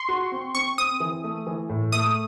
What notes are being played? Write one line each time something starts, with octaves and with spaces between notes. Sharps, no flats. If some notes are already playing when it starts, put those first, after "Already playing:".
Already playing: C6 C#6
F#4
C4
C4 C#6
C4 D#6
E3
A3
E3
A2
A3 D#6